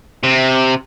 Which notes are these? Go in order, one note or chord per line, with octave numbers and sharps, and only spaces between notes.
C3